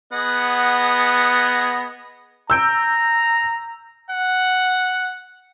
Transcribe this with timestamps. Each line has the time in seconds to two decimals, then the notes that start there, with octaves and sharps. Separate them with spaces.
0.13 B3 G#4 D#5 F#5
2.50 A#5 E6 G6 D7
4.11 F#5